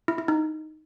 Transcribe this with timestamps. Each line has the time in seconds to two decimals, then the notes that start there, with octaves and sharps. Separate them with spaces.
0.08 E4
0.18 E4
0.28 D#4